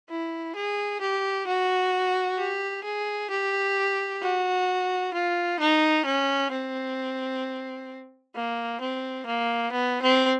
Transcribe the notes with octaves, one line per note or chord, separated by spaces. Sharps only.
E4
G#4
G4
F#4
G4
G#4
G4
F#4
F4
D#4
C#4
C4
A#3
C4
A#3
B3
C4